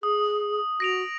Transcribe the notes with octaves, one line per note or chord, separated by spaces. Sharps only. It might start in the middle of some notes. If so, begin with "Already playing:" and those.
G#4 D#6
F#4 A#6 D7 F7